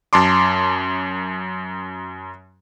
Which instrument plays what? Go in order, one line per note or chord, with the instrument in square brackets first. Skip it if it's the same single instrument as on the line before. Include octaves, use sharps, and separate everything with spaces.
[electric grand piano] F#2 A5 C6 D6